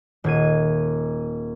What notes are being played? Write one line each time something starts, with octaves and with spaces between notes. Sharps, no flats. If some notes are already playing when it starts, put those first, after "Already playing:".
D#1 G#6 D#7